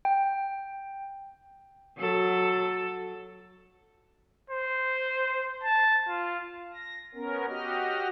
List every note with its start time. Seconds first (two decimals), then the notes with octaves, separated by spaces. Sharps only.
0.05 G5
1.97 F#3 A4
4.50 C5
5.63 A5
6.08 F4
6.74 A#6
7.14 B3 C#4 A#4
7.48 F#4 G4 D#5 F6